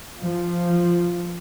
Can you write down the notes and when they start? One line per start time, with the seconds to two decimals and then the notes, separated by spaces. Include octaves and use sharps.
0.22 F3